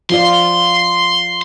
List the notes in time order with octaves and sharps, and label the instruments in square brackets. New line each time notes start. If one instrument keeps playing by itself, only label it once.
[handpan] F3 F4 D5 [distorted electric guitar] C6